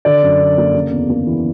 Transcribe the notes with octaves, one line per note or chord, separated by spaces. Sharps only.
D3 D5
F#2
D4
A#3
C#3
E2
A#3
E3